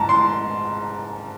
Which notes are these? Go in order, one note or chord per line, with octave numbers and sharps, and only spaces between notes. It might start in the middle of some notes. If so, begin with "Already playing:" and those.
Already playing: G#2 A5 A#5
C6